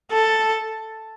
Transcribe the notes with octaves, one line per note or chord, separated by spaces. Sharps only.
A4